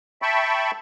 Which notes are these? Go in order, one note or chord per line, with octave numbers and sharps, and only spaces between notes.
E5 G5 A5 B5 C#6